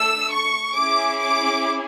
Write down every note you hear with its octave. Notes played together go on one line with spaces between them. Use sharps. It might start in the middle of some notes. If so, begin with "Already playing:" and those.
Already playing: A3 D4 A4 E6
C#6
C#4 E4 G#4 D6
D6